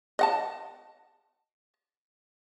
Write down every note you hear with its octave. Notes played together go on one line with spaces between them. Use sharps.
D#5 F#5 A5